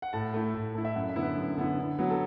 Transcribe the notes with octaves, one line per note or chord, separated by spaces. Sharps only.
F#5
A2 A5
A3 E4
A2
A3 E4
E5
F#2 F#5
E5
D3 B3 E4
B4
F#2
D3 B3 E4
D3
F#3 B3 E4
A4